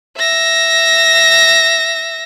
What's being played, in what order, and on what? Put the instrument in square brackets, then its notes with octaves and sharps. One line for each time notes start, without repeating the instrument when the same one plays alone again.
[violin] E5 A#6